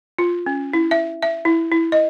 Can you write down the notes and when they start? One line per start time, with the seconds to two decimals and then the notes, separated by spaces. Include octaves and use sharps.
0.18 F4
0.46 C#4
0.73 E4
0.91 E5
1.22 E5
1.45 E4
1.72 E4
1.92 D#5